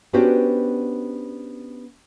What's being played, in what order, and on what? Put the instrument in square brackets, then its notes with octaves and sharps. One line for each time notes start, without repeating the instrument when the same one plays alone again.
[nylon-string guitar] B3 C#4 D4 F#4 G4 C5